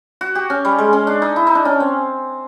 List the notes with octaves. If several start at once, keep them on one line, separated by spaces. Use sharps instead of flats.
F#4
G4
C#4
G3
G#3
C#4
D4
D#4
E4
D#4
D4
C#4
C4